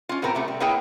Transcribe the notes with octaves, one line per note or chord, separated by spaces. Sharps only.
C#4 F4
A2 B3 C4 A#4 A#5
C3 A3 B3
G3
A#3 B3 E4 G#4 C#5 G5